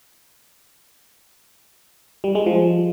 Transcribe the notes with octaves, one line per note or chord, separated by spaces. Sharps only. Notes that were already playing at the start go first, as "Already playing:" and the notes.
G3
G#3
F3